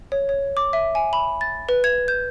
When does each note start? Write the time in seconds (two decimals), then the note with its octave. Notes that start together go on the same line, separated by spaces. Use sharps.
0.12 C#5
0.29 C#5
0.57 D6
0.73 E5
0.95 G#5
1.13 B5
1.41 A6
1.69 B4
1.84 G#6
2.08 G6